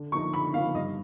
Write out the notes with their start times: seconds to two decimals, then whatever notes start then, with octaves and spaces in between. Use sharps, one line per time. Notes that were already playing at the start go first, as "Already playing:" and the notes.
Already playing: D3
0.12 F3 A#3 D#4 C#6
0.33 D3 B5
0.53 F3 A#3 D#4 F5
0.74 G2 D#5